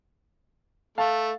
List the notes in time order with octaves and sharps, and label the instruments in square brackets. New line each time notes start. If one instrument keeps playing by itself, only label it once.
[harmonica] A3 [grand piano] F5 A5